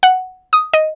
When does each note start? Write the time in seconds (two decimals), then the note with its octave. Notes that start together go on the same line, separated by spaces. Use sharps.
0.03 F#5
0.53 D#6
0.73 D#5